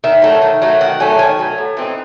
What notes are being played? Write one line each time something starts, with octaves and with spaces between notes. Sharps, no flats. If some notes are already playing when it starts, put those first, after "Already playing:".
D#3 E5
F#3 A3
D#3
F#3 A3
D#3 F#5
F#3 A3 G#5
D#3 G#5
F#3 A3
A2
E3 C4 D#4